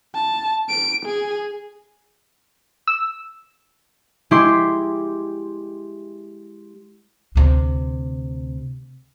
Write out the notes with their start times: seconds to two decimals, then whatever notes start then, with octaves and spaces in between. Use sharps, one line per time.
0.15 A5
0.69 D7
1.05 G#4
2.88 E6
4.31 G#3 E4 G4 C6
7.36 D2 C3